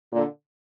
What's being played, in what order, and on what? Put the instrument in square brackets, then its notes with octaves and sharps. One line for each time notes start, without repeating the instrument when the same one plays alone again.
[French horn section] A#2 D3